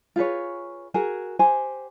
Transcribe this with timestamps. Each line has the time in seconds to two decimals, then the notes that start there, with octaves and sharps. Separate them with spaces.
0.16 F4 G#4 B4 C#5
0.94 F#4 G#4 A#4 G#5
1.39 G4 C5 G#5